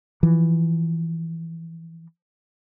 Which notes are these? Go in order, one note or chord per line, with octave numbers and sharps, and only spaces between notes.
E3 F3